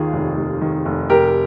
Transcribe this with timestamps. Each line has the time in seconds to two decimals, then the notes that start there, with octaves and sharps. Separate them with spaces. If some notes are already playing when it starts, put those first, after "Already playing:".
Already playing: D#2 D#3 F4 G#4
0.13 F1
0.37 F1
0.61 D#3
0.85 F1
1.09 F1 G4 A#4